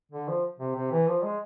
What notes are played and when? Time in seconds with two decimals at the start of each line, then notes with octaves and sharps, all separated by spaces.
0.12 D3
0.28 F3
0.59 C3
0.76 C3
0.92 E3
1.07 F3
1.23 G#3